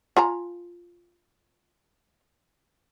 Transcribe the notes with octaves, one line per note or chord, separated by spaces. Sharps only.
F4 G#5 A#5